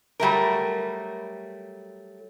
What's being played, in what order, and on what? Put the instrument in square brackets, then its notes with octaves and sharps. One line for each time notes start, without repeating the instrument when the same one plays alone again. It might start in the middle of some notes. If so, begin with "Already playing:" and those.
[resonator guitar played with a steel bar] F#3 G3 A3 A#4